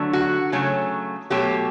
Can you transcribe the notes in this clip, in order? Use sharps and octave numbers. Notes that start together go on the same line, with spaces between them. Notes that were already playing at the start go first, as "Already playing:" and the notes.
Already playing: D3 F#3 A3
F#4
C#3 F#3 A3
B2 F#3 A3 G4